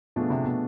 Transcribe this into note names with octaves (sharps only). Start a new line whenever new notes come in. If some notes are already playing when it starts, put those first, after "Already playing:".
B2 F3 A3 D4 F4 G#4
C3
B2